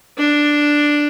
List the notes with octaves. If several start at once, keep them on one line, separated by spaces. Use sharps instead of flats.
D4